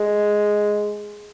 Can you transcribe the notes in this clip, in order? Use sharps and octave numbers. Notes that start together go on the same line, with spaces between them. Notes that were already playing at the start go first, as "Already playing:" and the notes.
Already playing: G#3